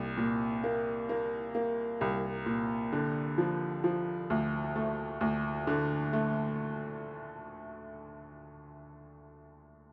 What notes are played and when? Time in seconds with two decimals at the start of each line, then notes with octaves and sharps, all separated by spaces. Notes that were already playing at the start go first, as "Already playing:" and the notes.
Already playing: C2 A#2
0.17 A#2
0.64 A#3
1.09 A#3
1.55 A#3
2.01 C2
2.46 A#2
2.93 D3
3.38 F3
3.84 F3
4.30 D2
4.76 A3
5.21 D2
5.67 D3
6.13 A3